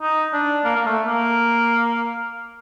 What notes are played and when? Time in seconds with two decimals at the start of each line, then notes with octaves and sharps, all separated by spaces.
0.02 D#4
0.33 D4
0.65 A#3
0.76 A#3
0.86 A3
1.07 A#3